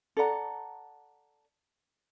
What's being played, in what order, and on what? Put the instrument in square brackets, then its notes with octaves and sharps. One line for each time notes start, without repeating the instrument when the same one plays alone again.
[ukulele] A4 D5 F#5 A#5